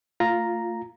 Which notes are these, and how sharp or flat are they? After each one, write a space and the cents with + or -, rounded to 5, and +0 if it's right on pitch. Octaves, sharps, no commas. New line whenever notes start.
A3 +35 F4 +0 A#5 +0